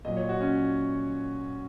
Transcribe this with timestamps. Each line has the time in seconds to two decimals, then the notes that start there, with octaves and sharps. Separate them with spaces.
0.05 A#2 F#3 D#5
0.17 C#5
0.29 F#4
0.41 C#4